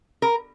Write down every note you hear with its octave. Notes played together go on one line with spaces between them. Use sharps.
A#4